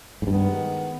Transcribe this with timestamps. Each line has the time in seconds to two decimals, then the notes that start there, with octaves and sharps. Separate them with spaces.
0.22 G#2
0.27 G2 D#3 G#3 B3